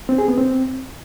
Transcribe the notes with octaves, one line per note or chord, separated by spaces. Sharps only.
C4
G#4
B3
C4